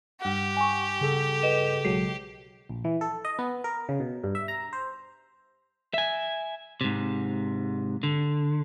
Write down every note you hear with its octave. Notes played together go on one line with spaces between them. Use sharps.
G2 G4 F#5
G#5 C#6
C#3 G#4 A4
B4 D#5 E7
B1 F#3 G#3 C7
A#1
E3
A4
D#5
B3
A#4
C#3
B2
G2
E5
A#5
C5
E5 G#5
G#2 C3
D3